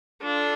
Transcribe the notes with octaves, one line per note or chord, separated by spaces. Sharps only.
D4 F4 A4